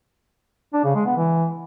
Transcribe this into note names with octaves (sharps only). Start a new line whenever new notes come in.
D4
C#3
G#3
B3
E3